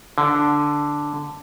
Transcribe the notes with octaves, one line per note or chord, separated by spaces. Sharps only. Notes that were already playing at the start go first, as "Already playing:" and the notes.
D3